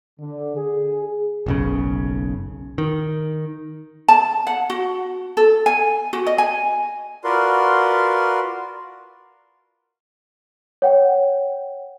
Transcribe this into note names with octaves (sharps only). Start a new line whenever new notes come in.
D3
G#4
F#1 B1 C#3
D#3
A5
F#5
F#4
A4
G#5
F#4
D#5
G#5
F4 F#4 A#4 B4 D5 C6
C#5 F#5 G5